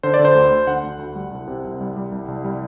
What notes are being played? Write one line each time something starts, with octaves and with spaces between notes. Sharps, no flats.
D3 C5
D5
D3
C5
D2
D2
D3 F#5
D2
D2
G3
C2
C3
C2
G3
G3
C2
C2
G3